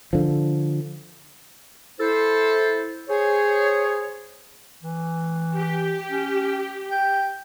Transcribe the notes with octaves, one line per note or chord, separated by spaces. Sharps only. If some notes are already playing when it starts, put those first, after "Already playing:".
D3 F3
E4 A4 C5
G#4 C5 C#5
E3
G4
C#4
G5